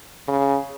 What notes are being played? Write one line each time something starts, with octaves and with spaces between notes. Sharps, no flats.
C#3